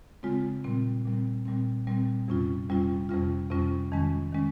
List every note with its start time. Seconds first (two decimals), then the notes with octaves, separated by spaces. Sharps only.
0.23 C#3 G#3 C4 F4
0.64 A#2 G3 C4
1.05 A#2 G3 C4
1.45 A#2 G3 C4
1.87 A#2 G3 C4
2.28 F2 C3 G3 C#4 F4
2.69 F2 C3 G3 C#4 F4
3.09 F2 C3 G3 C#4 F4
3.50 F2 C3 G3 C#4 F4
3.91 F2 D#3 G#3 C#4
4.33 D#3 G#3 C#4